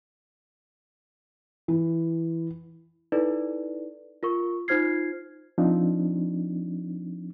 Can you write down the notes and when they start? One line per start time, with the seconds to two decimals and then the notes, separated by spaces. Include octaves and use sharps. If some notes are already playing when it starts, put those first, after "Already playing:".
1.68 E3
3.12 D#4 E4 A4 B4 D5
4.23 F4 A#4 C#6
4.68 D#4 F4 C5 F6 G#6 C7
5.58 F3 C4 D4 D#4